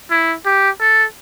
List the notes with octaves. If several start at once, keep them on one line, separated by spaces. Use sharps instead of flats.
E4
G4
A4